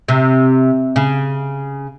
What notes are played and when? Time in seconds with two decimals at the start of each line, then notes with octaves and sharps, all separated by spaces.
0.08 C3
0.96 C#3